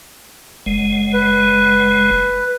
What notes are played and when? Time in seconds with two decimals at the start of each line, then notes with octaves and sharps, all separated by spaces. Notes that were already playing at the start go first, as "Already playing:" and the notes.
0.66 F#1 G#3
1.14 B4